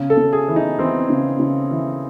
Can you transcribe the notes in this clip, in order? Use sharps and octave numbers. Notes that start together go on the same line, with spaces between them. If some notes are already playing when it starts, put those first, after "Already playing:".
Already playing: C#3
A4
C#3
G#4
E3
D#4
E3 C4
C#3
C#3
E3